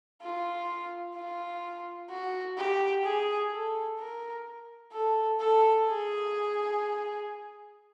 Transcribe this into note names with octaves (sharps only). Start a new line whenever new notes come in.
F4
F4
F#4
G4
G#4
A4
A#4
A4
A4
G#4